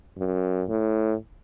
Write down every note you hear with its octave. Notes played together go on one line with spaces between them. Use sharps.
F#2
A2